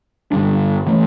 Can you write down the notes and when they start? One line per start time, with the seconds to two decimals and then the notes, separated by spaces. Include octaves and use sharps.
0.32 G2 D3 G3 D4
0.87 E3 A3